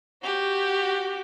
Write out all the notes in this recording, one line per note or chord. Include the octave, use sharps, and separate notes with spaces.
F#4 G4